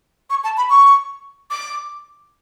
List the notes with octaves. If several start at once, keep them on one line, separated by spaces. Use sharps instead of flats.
C#6
A5
B5
C#6
D6